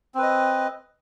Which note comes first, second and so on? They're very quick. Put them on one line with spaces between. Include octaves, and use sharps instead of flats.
C4 B4 D#5